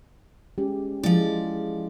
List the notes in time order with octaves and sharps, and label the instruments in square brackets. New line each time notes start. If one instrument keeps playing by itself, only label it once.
[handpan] G#3 C#4 G4
[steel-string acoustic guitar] F3 D5 [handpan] G#3 E4